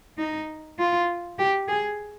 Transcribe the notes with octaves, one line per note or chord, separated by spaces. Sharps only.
D#4
F4
G4
G#4